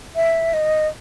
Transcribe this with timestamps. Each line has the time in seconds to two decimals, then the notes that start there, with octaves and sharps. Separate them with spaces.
0.16 E5
0.53 D#5